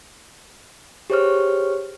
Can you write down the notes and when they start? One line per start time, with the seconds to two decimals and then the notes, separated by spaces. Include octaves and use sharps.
1.10 G4 G#4 C5 C#5 C#6 F6